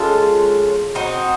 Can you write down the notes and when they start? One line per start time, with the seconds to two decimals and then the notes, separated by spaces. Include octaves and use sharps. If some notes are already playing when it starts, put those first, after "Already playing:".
Already playing: G#3 C#4 F4 A4
0.95 C4 D#4 F#4